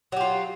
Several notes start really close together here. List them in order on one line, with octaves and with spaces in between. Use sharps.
F#3 G4 F4